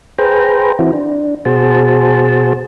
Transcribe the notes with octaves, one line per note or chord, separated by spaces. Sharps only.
G#4 B4 C5 G5 A#5
E3 C4 E4 F#4
D4
B2 F#4 G#4 C5 A5